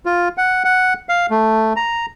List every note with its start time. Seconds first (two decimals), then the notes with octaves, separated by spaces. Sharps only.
0.06 F4
0.38 F#5
0.64 F#5
1.09 F5
1.31 A3
1.76 A#5